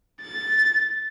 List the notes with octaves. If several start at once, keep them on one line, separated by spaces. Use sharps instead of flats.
A6